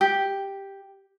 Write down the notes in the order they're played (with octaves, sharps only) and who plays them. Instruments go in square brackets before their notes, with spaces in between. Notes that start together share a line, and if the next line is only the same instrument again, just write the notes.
[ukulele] G4